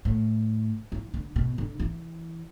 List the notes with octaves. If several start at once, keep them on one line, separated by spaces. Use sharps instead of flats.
A2
E3
D3
B2
D3
E3